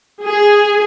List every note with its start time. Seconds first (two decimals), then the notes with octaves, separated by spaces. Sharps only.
0.24 G#4